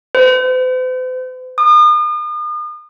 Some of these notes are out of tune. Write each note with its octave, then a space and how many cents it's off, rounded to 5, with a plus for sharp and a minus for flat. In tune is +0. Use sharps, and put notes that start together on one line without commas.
C5 -45
D#6 -40